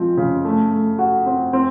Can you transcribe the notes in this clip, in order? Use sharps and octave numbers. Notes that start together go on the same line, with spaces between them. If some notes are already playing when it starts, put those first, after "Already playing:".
Already playing: F3 G#3 C4
C#3
A3
A3
F#4
C4
C4